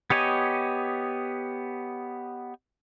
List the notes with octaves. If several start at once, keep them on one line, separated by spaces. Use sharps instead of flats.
B3 G4 C#5 D#5 G#5